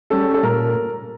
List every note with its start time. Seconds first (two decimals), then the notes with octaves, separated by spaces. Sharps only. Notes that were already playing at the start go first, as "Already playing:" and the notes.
0.10 G3 C#4 A4
0.34 A4
0.43 A#2 A#4